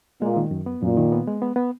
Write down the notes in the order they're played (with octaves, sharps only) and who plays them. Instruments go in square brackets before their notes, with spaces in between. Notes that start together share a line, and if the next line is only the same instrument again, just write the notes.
[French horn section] A#2 [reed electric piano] G#3
[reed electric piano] D#3
F#2
B3
[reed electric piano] F#2 [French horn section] A#2
[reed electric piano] D#3
B3
G#3
B3
B3